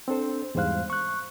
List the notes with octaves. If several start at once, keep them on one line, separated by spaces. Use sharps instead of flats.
C4 D4 A4 C5
E2 G#2 G3 C5 F5 F#6
C#6 F#6